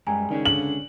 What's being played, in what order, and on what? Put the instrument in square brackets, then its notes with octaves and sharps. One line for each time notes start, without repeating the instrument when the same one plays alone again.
[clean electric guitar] F#2 G3 G#3 [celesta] G5 G#5 A#5
[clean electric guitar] C#2 C#4 G#4 [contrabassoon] D#3 [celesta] D5
[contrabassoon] D3 [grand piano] F#7